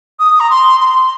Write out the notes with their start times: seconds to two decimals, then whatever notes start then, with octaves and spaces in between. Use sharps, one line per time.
0.19 D#6
0.40 A#5
0.50 C6
0.80 C6